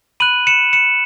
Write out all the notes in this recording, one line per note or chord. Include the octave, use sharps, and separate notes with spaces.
B5 F#6 D#7 F#7
C#7 E7
C#7 E7